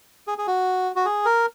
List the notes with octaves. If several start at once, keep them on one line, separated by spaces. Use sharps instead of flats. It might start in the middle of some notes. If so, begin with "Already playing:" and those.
G#4
G#4
F#4
F#4
G#4
A#4